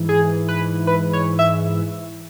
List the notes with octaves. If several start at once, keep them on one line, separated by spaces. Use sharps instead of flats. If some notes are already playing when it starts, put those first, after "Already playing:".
Already playing: G#2 E3
G#4
B4
B4
C#5
E5